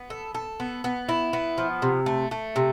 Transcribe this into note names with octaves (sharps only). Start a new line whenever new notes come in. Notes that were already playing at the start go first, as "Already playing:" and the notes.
Already playing: B3
A4
A4
B3
B3
E4
B3
F3
C3
A3
A3
C3